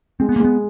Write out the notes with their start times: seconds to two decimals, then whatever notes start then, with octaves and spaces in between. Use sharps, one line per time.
0.20 G#3 C4
0.29 B3
0.36 A#3
0.40 G#3 B3